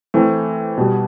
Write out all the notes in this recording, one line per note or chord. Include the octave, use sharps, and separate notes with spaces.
E3 A3 C4
B2 G3 B3